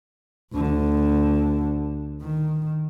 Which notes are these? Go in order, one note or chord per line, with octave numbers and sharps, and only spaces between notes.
D2 D3
D#3